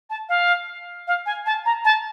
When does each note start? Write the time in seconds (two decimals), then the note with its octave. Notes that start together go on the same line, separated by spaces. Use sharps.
0.10 A5
0.29 F5
1.07 F5
1.26 G#5
1.46 A5
1.66 A#5
1.85 A5